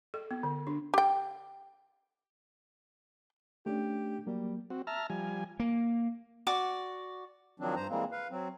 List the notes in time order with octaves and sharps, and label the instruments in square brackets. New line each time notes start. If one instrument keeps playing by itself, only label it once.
[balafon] A4
B3
D3
D4
[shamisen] G4 G5
[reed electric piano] A3 C#4 D4 [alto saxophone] G4
[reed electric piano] F#3 A#3 [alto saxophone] G3
[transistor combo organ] C4 F#4
E5 A5 A#5 F6
F3 G3 G#5
[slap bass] A#3
[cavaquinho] F#4 D5 D6
[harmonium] D#3 F3 F#3 C4 D4
G2 C5 A#5
E3 G3 G#3 A#3 C4
B4 F5
F#3 C4